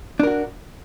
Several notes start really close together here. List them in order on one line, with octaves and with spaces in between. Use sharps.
D4 A#4 F#4